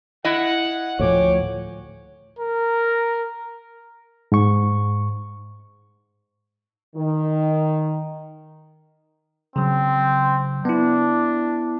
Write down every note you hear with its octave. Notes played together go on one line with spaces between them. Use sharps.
E4 D#5 F#5
D2 A2 F3 C#5 G5 G#5 D6
A#4
G#2 C#6
D#3
C#3 F#3 C4
B3 D4 E4